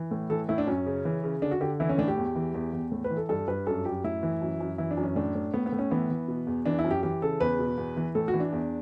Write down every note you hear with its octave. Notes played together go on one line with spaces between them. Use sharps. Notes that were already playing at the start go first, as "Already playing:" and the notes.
Already playing: E3
A2
E3 A4
A2 E4
D4
F#2 C#4
C#3
E3
C#3
D3 D4
F#4
D3 G4
E3 E4
C#4
A2 D4
G4
E2
E3
E2
E2
A2
B4
E3
A4
G2 A4
G2 B4
F#2 A4
F#2 G4
A2 E4
E3
F#2
F#2
E3 E4
D4
F#2
C#4
A2 D4
A2
A2 B3
B3
A2
C#4
E3 B3
E3
B2
E2
E3 D4
E4
F#2
G4
E3 G4
C#3 A4
E2 B4
B2
E2
E3
A2 A4
F#4
E3
D4
E2